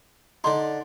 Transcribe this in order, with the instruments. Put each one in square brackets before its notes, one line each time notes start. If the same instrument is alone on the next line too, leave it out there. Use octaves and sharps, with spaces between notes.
[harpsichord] D3 D#4 [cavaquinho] D5 C6